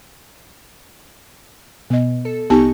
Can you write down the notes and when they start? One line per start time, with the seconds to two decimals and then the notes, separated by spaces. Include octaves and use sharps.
1.90 B2 B3 D#5
2.25 A4
2.50 C2 B3 D#4 G4 A5 C#6